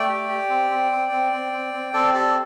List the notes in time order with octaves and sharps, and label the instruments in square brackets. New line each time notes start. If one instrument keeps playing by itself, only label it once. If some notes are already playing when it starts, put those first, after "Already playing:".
Already playing: [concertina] A3 D5 G5
G4
G4
C4
C4
C4
C4
C4
C4
C4
C4 A4 D5
G4 A4 D5